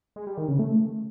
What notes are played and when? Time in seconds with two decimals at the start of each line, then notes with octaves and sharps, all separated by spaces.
0.16 G#3
0.27 G3
0.38 D#3
0.48 C#3
0.59 A3